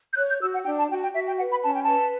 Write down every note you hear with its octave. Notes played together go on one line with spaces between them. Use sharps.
G6
C#5 F#6
G6
F#4 E6
F#5
D4 G5
A5
F#4 G5
G5
F#4 E5
G5
B4 F#5
B5
C#4 A5
G5
B4 A5